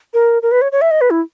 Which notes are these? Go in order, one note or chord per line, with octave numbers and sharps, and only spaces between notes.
A#4
A#4
B4
C#5
C#5
E5
D#5
B4
E4